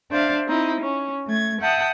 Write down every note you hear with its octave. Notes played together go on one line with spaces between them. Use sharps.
D4 C5 E5 F5
C4 D#4 E4
C#4
A3 G#6
E5 F#5 G5 A5 D#6